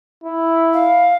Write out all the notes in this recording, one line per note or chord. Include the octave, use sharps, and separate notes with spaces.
E4
F5